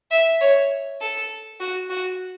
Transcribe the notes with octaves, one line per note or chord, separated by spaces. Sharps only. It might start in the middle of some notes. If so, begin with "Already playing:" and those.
E5
C#5
A4
F#4
F#4